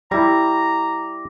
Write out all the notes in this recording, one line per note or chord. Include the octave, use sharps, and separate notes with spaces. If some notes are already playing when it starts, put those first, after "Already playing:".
G3 E4 A#5 D6 A#6